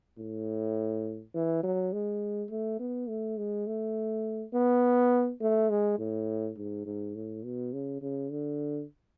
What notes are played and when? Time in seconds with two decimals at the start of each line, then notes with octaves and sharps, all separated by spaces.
0.19 A2
1.34 E3
1.63 F#3
1.93 G#3
2.50 A3
2.79 B3
3.08 A3
3.37 G#3
3.67 A3
4.54 B3
5.41 A3
5.70 G#3
5.99 A2
6.57 G#2
6.86 G#2
7.15 A2
7.44 B2
7.73 C#3
8.02 C#3
8.31 D3